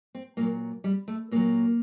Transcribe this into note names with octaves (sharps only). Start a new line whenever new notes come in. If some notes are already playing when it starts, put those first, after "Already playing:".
C4
A#2 F#3 A#3
G3
A3
A#2 F#3 A#3